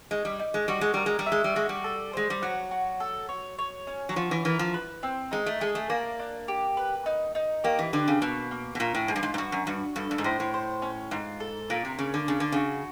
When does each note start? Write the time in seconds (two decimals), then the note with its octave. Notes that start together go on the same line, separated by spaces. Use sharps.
0.11 G#3 D#4
0.25 G3
0.40 D#4
0.54 G#3
0.68 G3 F#4
0.81 G#3
0.94 G3 A#4
1.06 G#3
1.19 G3
1.26 E5
1.32 G#3
1.44 G3
1.56 G#3 F#4
1.69 G3
1.84 A4
2.13 G#3 C5
2.30 G3
2.42 F#3 F#5
2.71 F#4
3.00 A4
3.29 C#5
3.59 C#5
3.87 C#4
4.09 F#3
4.16 F3 F#4
4.31 E3
4.45 E3 A#4
4.59 F3
4.74 B4
5.03 C4
5.31 G#3 D#4
5.46 A3
5.60 G#3 G#4
5.75 A3
5.90 A#3 D5
6.19 D4
6.48 G4
6.77 B4
7.06 D#4
7.35 D#4
7.64 A#3 G4
7.79 E3
7.93 D3 B4
8.08 C#3
8.21 B2 A#3
8.51 A#3
8.75 B2
8.79 A#2 C#4
8.95 A2
9.08 G#2 F4
9.16 G2
9.23 G#2
9.34 G#2
9.38 G2 F#4
9.52 F#2
9.66 G2 F#4
9.96 G2 A4
10.11 G2
10.18 G#2
10.24 A2 C5
10.40 A2
10.54 C5
10.82 C#4
11.11 G#2 F4
11.40 A4
11.70 A#2 A#4
11.85 C3
11.99 C#3 A#3
12.14 D3
12.28 C#3 D4
12.40 D3
12.52 C#3 F#4